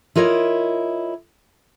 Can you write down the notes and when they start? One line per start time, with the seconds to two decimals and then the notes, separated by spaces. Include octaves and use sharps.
0.15 E4 F4 A#4 C#5 D#5